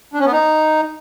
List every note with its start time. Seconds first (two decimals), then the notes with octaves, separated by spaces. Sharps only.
0.14 D4
0.20 C#4
0.26 B3
0.32 D#4